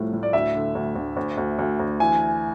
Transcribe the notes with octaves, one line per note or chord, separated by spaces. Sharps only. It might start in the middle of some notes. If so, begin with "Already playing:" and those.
Already playing: C2 A2 F3 A3
A2
D5
D2 E5
D3
D2
D2
D2
D2
D2
D2
E3 G#5